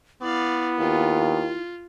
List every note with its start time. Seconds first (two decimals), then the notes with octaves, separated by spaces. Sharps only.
0.22 B3 E4 D5 F5
0.79 D#2 F4